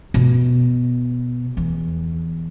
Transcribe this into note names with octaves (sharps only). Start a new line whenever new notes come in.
B2
E2